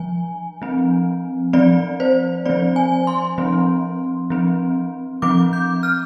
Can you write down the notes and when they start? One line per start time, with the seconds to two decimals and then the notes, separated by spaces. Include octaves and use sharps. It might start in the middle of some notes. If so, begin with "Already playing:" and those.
Already playing: F3 G#5
0.62 F3 C4
1.53 F3 C4 D5
2.00 C5
2.46 F3 C4 D5
2.76 G#5
3.07 C6
3.38 F3 C4
4.30 F3 C4
5.22 F3 C4 D6
5.53 G6
5.83 F6